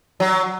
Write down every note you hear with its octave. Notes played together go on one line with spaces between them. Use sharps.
F#3